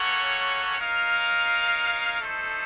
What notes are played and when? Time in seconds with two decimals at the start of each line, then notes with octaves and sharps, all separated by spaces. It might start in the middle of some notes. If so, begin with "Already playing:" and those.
Already playing: A#3 C#4 A4 C#5 F#5
0.79 D#4 A#4 C#5 F5
2.20 A3 D#4 A4 C5